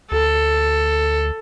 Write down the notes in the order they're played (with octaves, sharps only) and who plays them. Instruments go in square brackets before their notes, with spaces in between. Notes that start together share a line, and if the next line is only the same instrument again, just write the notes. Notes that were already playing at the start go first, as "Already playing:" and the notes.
[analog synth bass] D2 [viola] A4